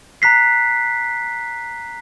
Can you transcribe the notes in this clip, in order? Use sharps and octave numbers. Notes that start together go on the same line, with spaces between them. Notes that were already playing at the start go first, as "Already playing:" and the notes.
A#5 F#6 B6 C7